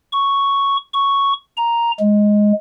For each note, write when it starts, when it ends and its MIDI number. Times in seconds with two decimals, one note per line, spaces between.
0.12 0.77 85
0.93 1.33 85
1.57 1.91 82
2.00 2.52 56